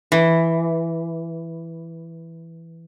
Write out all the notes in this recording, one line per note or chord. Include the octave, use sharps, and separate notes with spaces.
E3